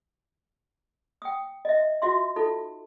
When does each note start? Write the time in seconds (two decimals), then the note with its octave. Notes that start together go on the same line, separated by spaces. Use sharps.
1.22 G5 D#6
1.65 D#5 E5
2.02 F4 F#4 E5 C6
2.36 D#4 F4 A4